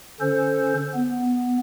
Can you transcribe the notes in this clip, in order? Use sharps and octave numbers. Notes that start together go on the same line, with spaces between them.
D3 C#4 A4 C5
B3